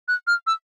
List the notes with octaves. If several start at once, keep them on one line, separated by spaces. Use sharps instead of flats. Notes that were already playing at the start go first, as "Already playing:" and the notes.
F#6
F6
E6